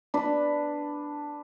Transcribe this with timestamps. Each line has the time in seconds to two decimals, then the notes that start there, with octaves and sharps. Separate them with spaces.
0.14 D4 B4